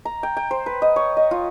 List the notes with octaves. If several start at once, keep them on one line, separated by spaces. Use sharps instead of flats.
A#5
G5
G5
C5
B4
D#5
C#5
D#5
F4